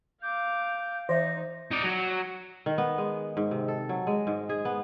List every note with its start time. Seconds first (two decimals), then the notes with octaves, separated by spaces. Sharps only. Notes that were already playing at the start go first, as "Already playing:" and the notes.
0.22 F5 D6 G6
1.09 E3 D#4 C5 E5 A#6
1.71 D#4 D5
1.83 F#3
2.66 D#3
2.78 B3
2.98 G#3
3.37 G#2
3.51 C3
3.68 A4
3.89 F#3
4.07 G#3
4.27 G#2
4.49 G#4
4.65 B3